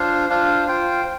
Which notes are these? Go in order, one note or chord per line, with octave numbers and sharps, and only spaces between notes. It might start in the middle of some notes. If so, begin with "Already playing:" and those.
Already playing: D4 F4 C5 F5
D4 F4 C5 F5
F4 C5 G5